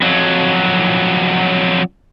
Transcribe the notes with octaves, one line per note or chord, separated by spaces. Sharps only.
F2 F#3